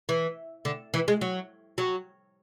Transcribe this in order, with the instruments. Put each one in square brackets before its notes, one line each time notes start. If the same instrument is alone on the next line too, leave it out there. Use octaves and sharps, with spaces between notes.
[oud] E3
D3
E3
G#3
F#3
F#3